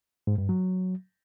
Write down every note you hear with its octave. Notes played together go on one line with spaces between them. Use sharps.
G#2
G2
F#3